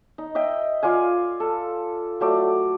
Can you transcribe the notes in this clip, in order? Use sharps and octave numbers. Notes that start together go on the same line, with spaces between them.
D#4
D#5 E5 G5
F4 D5 F5 G#5
A4
F#3 A3 D5